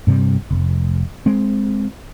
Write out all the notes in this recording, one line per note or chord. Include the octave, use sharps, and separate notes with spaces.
G2 C3 G3
F1
G#3 C4